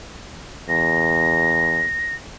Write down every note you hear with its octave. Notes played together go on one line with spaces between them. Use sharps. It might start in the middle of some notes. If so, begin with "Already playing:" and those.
E2 A#6